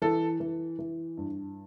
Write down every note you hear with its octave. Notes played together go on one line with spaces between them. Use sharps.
E3 A4
E3
E3
G2